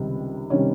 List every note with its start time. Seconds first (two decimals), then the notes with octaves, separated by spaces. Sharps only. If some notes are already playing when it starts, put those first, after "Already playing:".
Already playing: C#2 C3 D#3 G3
0.50 C3 D#3 G3 C#4 C#5